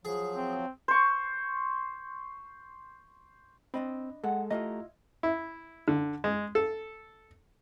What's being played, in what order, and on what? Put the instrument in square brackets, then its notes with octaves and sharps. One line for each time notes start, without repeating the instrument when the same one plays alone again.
[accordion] F3 F#3 [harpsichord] G#4
[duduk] C4
[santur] C5 C#6
[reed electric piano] C4 [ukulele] D4 D#5 B5
[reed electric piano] G#3 A4 [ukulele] F#5
[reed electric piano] A3 G4 A#5 [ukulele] E4 F4 D#5
[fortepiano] E4
D3
G#3
A4